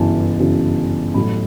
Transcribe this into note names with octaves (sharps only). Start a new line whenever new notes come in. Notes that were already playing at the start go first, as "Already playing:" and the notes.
Already playing: G1 F#2 C#3 E3 A5
G1 F#2 C#3 E3
A1 A2 F#3 A3 B5